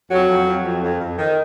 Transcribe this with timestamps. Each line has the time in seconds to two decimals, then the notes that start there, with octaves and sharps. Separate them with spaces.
0.11 F2 F#3
0.29 F2
0.47 F2
0.64 F2
0.82 F2
1.00 F2
1.18 D#3